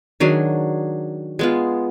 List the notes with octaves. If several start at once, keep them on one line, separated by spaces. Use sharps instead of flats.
D#3 F#3 D4 G#4
G#3 B3 F4